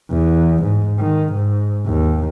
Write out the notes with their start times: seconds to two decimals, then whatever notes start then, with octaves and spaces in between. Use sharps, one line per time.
0.10 E2
0.63 G#2
0.99 D#3
1.33 G#2
1.86 D#2